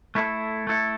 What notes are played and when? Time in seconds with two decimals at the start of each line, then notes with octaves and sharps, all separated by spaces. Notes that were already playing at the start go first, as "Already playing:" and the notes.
0.15 A3 E4 A4
0.67 A3 E4 A4